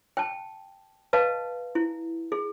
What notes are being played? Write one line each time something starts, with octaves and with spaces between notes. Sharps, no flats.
G5 A5
B4 D#5 F5 A5
E4
G#4